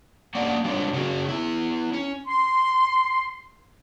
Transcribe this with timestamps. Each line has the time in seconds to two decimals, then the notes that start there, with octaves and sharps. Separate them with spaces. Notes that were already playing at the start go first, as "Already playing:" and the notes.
0.35 A#3 C#4 D4 D5 F#5
0.64 G3 G#3 D4 F4 C5 C#5
0.93 C#3 C#4 F#4 G#4
1.28 B3 E4
1.93 C#4
2.26 C6